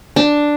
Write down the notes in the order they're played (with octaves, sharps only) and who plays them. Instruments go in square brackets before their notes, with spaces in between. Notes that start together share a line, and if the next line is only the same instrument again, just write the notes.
[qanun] D4